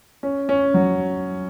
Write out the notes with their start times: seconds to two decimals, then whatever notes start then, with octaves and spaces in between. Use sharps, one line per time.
0.23 C#4
0.49 C#4
0.74 F#3